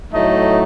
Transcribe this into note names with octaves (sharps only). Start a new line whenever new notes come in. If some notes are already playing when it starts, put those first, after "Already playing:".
A2 F#3 A3 D#4 D#5